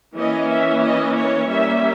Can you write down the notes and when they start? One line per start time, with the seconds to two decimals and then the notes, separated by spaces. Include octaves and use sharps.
0.16 E3 A#3 C#4 D#5
0.49 E5
0.83 D#5
1.16 C#5
1.49 G3 A#3 C#4 E5